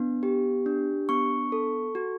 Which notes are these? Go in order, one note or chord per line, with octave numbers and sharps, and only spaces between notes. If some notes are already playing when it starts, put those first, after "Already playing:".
Already playing: B3 D4
G4
D4
B3 C#6
A4
F#4